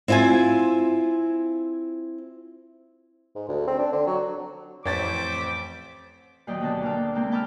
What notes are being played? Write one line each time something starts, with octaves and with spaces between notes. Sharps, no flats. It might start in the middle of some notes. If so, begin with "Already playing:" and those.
C4 E4 F4 G5 G#5
G#2
D2
C4
D4
D3
F#3
A1 F2 C5 C#5 D6 A6 B6
D#2 A#2 F#3 D5 D#5 G5
D2 B2 A5
A#2 A#3 F5 A5 D6 E6
C3 G#3 A#3 C4 G5
G5 A5 B5 D6 E6 F6